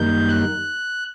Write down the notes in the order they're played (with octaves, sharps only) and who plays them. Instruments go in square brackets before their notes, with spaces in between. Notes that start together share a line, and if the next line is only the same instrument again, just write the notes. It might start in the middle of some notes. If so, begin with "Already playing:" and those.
Already playing: [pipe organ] F#2 D#3 G3 A#3 D#4 G6
F#6